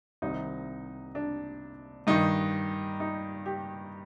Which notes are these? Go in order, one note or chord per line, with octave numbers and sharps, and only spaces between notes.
C2 C3 D#3 D#4
D4
G2 D#3 D#4
D#4
G4